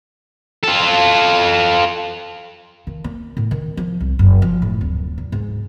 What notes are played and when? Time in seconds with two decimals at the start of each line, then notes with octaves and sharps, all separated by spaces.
0.63 F4 A4
2.87 D#3
3.04 A#3
3.37 A2
3.51 D#3
3.77 F3
4.00 C2
4.19 F#1
4.42 F3
4.62 A2
4.81 D1
5.18 E2
5.32 G#2